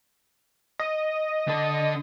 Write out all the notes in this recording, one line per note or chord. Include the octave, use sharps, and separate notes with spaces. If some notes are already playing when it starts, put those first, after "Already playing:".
D#5
D3 A4